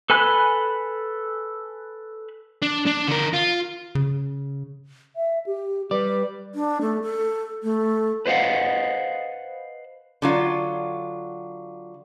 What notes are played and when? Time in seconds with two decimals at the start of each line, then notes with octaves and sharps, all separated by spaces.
0.10 A4 B4 G#5 B5 F#6
2.62 D4
2.87 D4
3.08 D3 A#4
3.33 F4
3.95 C#3
5.16 E5
5.46 G4
5.91 G3 B4 D5
6.55 D4
6.81 A3
7.03 A4
7.63 A3
8.26 B4 C5 D#5 F5 F#5
10.22 D3 F#3 F4